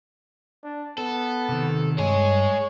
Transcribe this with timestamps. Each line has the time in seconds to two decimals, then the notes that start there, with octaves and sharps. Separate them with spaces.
0.63 D4
0.98 B3 A4
1.49 C3 D#3
1.98 G2 G#3 G#4 C#5